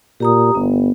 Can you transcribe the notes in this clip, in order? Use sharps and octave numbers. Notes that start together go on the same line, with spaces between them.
A#2 G4 A#5 D#6
G1 B3